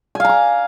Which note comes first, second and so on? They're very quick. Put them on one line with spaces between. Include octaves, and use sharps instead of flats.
G#5 F5 A#5 D6